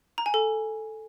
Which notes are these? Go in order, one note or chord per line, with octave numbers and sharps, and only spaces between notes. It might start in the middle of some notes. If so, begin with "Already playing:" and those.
A#5
G#5
A4